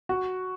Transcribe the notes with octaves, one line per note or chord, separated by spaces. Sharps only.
F#4